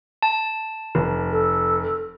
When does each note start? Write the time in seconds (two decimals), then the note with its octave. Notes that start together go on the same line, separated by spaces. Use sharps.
0.22 A5
0.95 F1
1.31 A4